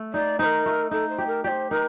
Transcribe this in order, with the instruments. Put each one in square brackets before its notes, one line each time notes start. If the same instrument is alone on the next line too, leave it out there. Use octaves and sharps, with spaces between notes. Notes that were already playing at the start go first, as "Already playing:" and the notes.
Already playing: [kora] A3
[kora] D#4 [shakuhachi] D5
[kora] D#4 [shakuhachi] C5
[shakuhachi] A#4
[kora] A3
[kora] D#4 [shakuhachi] A4
[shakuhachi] C5
[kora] G4
[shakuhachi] A#4
[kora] G4 [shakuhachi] C5 D5
[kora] D#4 [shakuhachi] A#4